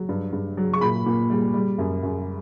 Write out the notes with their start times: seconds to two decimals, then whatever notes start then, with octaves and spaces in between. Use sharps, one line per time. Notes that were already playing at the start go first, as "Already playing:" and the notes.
Already playing: F#3
0.09 G2
0.33 G2
0.57 F#3
0.73 C#6
0.81 A#2 B5
1.06 A#2
1.30 G3
1.54 G3
1.78 F#2
2.03 F#2